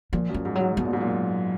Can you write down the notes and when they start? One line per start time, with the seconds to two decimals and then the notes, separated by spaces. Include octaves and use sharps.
0.13 A#2 F3
0.30 F#2 F3
0.45 G#2
0.55 F#3
0.61 G#2
0.77 B2 F#3
0.85 A#2
0.93 G#2
1.01 A#2